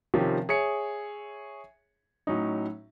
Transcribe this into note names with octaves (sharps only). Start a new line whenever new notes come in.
C3 D#3 F3 C4 C#4 G4
G#4 C#5 E5 C#7
A2 F#3 C#4 D#4